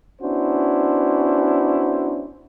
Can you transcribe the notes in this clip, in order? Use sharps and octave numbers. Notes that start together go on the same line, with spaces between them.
B3 C#4 D4 E4 F#4 C5